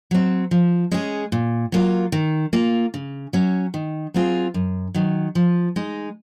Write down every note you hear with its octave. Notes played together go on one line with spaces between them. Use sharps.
F#3 C4
F3
G#3 C#4 G#4
A#2
F#3 A#3 F4
D#3
A#3 F4
C#3
F#3 C#4
D#3
F#3 C4 F4 G#4
F#2
D#3 F#3
F3
G#3 D#4